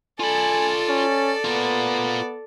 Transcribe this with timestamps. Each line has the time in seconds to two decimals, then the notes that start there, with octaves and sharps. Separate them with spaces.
0.20 F4 A4 D5 G#5 B5
0.89 C#4
1.45 B3 F4 A#4